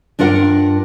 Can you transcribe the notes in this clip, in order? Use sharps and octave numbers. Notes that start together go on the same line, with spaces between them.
G2 D4 F4 A#4 F#5